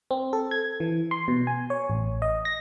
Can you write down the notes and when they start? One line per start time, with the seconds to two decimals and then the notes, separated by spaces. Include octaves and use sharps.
0.11 C4
0.33 A4
0.51 G#6
0.80 E3
1.11 C6
1.28 B2
1.47 G#5
1.70 C#5
1.90 A1
2.22 D#5
2.45 A#6